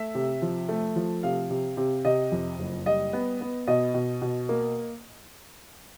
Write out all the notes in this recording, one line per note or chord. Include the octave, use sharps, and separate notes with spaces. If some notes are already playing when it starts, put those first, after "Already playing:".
Already playing: A3 E5
C3
F3
A3
F3
C3 F5
C3
C3
C3 D#5
F2
F#1
G3 D#5
B3
B3
B2 D#5
B2
B2
A#3